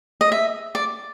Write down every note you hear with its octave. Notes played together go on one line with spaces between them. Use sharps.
D#5
E5
D5